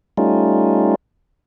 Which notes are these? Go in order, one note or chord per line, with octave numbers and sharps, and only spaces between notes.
G3 A3 C#4 D#4 F4